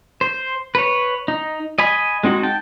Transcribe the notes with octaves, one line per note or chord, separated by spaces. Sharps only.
C5
B4 C#5
D#4
D#5 G#5 B5
G#3 C4 D#4 F#4
G5 A5